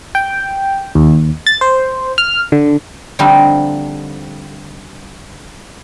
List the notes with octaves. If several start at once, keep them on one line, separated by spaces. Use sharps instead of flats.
G5
D#2
A6
C5
F6
D3
D3 F3 G3 A3 C4 D#4